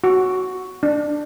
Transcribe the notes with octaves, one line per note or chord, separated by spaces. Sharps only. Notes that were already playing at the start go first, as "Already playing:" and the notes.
F#4
D4